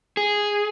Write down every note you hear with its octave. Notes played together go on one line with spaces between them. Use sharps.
G#4